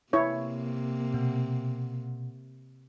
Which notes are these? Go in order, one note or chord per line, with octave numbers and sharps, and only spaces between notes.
C3 A#3 E4 C#5
B2